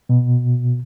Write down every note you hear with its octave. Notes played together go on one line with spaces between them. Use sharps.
B2